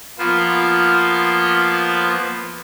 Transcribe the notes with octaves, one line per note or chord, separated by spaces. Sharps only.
F3 A#3 B3 F4 C5